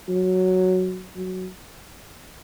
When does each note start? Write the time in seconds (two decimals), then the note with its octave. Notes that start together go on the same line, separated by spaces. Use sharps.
0.09 F#3
1.16 F#3